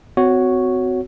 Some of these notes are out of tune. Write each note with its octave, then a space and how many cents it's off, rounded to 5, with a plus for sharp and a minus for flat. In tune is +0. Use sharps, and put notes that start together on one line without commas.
C4 -40 F#4 +0 C#5 +0